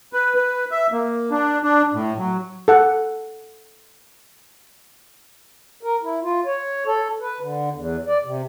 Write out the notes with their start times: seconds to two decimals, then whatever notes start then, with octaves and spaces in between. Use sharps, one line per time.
0.13 B4
0.36 B4
0.71 E5
0.92 A#3
1.31 D4
1.63 D4
1.94 A2
2.18 F#3
2.68 A4 F#5
5.83 A#4
6.03 E4
6.23 F4
6.45 C#5
6.86 A4
7.20 B4
7.40 D3
7.71 E2
8.07 D5
8.24 C3